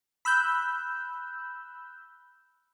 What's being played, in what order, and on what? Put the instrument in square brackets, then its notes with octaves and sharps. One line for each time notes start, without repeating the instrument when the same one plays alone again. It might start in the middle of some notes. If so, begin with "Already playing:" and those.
[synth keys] B5 E6 F#6 G6